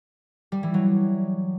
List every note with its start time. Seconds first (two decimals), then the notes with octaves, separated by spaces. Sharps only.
0.52 G3
0.63 E3
0.74 F#3